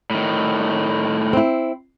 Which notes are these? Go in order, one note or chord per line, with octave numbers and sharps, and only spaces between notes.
A2 D#3
C4 E4